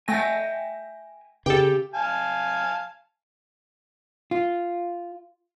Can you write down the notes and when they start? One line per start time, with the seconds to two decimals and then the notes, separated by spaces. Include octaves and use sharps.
0.08 A3 E5 G5 G#5 A#6
1.46 C#3 G4 A4 G5
1.94 F5 G#5 A5
4.31 F4